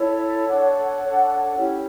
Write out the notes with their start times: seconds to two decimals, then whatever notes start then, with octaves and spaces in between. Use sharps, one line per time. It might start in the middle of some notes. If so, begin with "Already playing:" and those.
Already playing: E4 A4 C#5
0.47 D4 A4 C#5 F#5
1.02 D4 A4 C#5
1.56 C#4 E4 G4 C#5